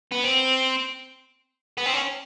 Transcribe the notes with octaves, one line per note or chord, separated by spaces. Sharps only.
B3
C4
B3
C4
C#4